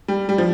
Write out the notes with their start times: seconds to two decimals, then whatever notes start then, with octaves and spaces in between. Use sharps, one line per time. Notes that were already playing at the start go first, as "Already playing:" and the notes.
0.08 G3
0.29 G3
0.38 F3